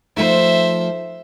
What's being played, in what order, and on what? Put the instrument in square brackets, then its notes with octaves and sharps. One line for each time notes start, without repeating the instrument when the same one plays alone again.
[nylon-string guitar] F3 A3 D#4 [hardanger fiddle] C5 E5